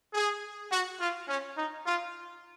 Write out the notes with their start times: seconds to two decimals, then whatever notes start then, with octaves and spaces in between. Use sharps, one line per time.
0.12 G#4
0.70 F#4
0.98 F4
1.27 C#4
1.56 D#4
1.86 F4